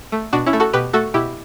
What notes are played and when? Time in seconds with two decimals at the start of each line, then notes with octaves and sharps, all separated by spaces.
0.12 A3
0.33 B2 D4 F#4
0.46 C#4 E4
0.53 A3
0.60 F#4 A4
0.73 B2 G4 B4
0.93 A3 F#4 A4
1.14 B2 E4 G4